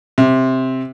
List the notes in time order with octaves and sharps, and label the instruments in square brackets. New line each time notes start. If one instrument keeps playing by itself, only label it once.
[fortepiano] C3